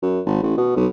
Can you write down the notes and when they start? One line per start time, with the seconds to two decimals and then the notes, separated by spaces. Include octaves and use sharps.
0.03 F#2
0.26 G#1
0.43 A1
0.57 B2
0.76 B1